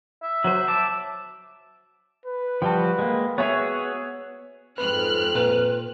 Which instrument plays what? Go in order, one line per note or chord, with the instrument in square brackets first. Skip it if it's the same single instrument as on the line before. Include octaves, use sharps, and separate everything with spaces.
[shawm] E5
[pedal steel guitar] F#3 C5
A5 D6
[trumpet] B4
[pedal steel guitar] F3 G3 F#4 [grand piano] G5 A5
[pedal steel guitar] G#3 A#3
[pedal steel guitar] B3 F#4 G#4 [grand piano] C#5 E5 G#6
[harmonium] F2 C4 [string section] G#2 F6 F#6 [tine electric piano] B4
[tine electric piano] A#2 [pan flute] B4